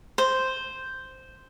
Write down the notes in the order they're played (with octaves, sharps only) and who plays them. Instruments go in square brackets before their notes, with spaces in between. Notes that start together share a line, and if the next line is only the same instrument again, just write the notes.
[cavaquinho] C5